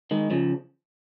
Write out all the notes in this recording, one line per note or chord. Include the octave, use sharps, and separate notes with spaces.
D#3 G#3
C#3 F3